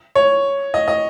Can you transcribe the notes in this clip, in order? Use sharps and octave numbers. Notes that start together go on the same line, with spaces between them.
C#5
D#5
D#5